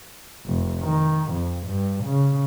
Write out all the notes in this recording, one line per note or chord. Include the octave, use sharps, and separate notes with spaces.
F1
D#3
F2
G2
C#3